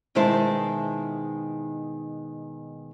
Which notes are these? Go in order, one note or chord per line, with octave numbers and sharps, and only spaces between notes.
B2 D#3 G#3 E4 C5 A5